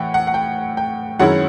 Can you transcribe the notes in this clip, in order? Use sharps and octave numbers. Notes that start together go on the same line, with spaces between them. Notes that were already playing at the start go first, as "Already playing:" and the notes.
Already playing: A2 E3 F#5 G5
F#5
F#5
G5
G5
F#2 D#3 G#3 C#4 E4 F#5